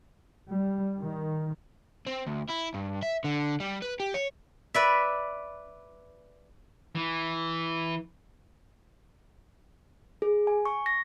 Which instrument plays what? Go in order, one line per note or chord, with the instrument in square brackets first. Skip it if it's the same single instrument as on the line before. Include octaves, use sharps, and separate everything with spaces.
[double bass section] G3
D#3
[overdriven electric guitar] C4
D2
E4
G2
E5
D3
G3
B4
G4
C#5
[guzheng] B4 D5 E5
[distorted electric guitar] E3
[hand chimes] G#4
G#5
C#6
A#6